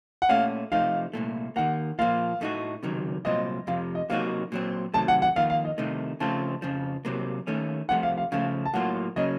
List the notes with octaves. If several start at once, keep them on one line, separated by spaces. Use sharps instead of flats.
F#5
A#2 A3 C#4 F5
C3 F3 A3 D#4 F5
C2 A#2 A3
D#2 D#3 A#3 F#5
A#2 F3 A#3 F4 F5
A2 A3 D#4 F#4
C#2 C3 D#3 F#3
C2 A#2 F#3 C4 F4 D#5
F2 C3 F3 F5
D#5
C3 F#3 A#3 D#4 F#4 F5
A#2 F#3 C4
C3 D#3 F#3 A3 A5
F#5
F#5
F2 D#3 A#3 F4 F5
F5
D#5
C2 C3 D#3 A3 D#4
C#3 F3 A3 C4 F4 A5
F2 C#3 F3
C2 C3 F#3 A#3
D#2 D#3 A3 C#4
C2 C3 F3 A3 F#5
F5
F5
C#3 F3 A3 F5
A5
A2 F#3 A#3 F4 F#5
C#3 F#3 A#3 C#4 D#5